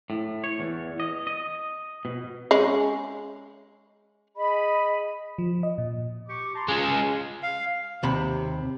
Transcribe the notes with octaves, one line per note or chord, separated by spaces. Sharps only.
A2
C#5
E2
D#5
D#5
B2
G#3 C#4
G#4 D#5 B5
F3
D#5
A#2
G4 C#6 D6
A5 A#5 C6
G#3 C#4 F4 F5 G#5
F5
D#2 C3 B5